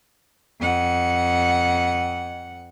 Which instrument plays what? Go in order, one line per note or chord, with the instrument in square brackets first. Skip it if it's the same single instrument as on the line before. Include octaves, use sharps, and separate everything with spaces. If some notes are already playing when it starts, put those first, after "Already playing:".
[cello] F2 F#5